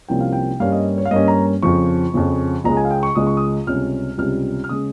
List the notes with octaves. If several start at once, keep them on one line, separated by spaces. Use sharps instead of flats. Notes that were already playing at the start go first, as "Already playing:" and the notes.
C2 C3 F3 A#3 C#4 G5
F5
G5
G2 G3 A#3 C#4 F5
D#5
C#5
F5
G2 G3 A#3 C#4 D#5
A#5
F2 C#3 F3 C#6
F2 C#3 F3
C#2 C#3 G#3 A#5
G#5
F5
G5
C#6
C#2 C#3 G#3 D#6
C#6
D#6
C#2 C3 G3 C#4 F6
C#2 C3 G3 C#4 F6
F6
C#3 G#3 C#4 D#6